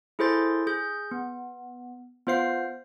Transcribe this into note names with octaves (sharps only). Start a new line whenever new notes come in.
E4 G#4 A4 C5 C6 A6
G#4 G6
B3
B3 F4 C5 F5 C7